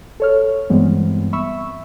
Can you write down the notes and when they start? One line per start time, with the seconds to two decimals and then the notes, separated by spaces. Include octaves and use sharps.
0.20 A4 C#5 F6
0.70 G2 E3 G3 G#3 B3 C4
1.33 E5 B5 C#6 E6